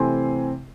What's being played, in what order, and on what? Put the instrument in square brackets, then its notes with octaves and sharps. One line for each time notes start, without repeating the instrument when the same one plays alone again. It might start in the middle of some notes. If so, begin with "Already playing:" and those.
Already playing: [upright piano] C3 E3 A3 C4 G#5 C6